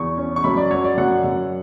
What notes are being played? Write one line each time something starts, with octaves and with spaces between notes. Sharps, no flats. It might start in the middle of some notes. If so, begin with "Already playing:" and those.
Already playing: E2 C#6
C#4
C#6
F#2 B5
D5
F#3 C#5
D5
F#2 F#5
F#2